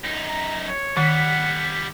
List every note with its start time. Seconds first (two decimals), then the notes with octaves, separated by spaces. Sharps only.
0.04 F#2 D#4
0.27 A#5
0.68 C#5
0.97 D#3 G3 B3 F#5